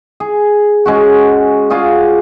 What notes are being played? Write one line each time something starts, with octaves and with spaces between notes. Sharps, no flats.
G#4
G#3 C#4 F#4
F4 F#4 G#4 D5